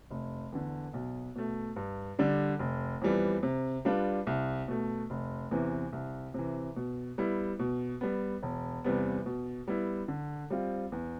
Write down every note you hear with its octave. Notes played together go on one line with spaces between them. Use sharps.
F1
E2 D3
B1
B2 A3
G2
D3 G3 D4
F1
F2 E3 G3 B3
C3
G3 D4 F4 B4
C2
B2 A3
F1
E2 C3 E3
C2
C3 E3
B2
G3 B3 E4
B2
G3 B3
E1
E2 C3 G3 B3
B2
G3 B3 E4
D3
G3 C4 F4
E2